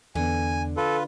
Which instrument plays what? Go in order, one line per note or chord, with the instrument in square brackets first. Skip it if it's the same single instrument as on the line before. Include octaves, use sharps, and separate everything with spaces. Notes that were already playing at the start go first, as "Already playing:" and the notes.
[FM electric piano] E2 B3 [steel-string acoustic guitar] D3 [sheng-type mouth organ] G#5
[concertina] F4 B4 [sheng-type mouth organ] A4